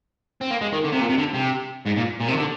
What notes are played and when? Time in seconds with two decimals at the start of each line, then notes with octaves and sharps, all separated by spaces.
0.41 C4
0.51 A#3
0.61 G#3
0.72 D#3
0.84 D3
0.92 C3
1.00 A#2
1.09 C3
1.18 D3
1.34 C3
1.86 G#2
1.96 A#2
2.20 A#2
2.28 C3
2.31 D#3
2.37 D3